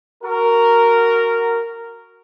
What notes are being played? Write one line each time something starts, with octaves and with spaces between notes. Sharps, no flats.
F#4 A#4